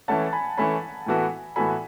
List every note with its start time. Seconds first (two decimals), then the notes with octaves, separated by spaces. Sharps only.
0.08 E3 A3 C#4 F#5 A5
0.33 G#5 B5
0.57 E3 A3 C#4 G#5 B5
1.06 A2 E3 B3 F#4 A4
1.56 A2 E3 B3 F#4 A4 G#5 B5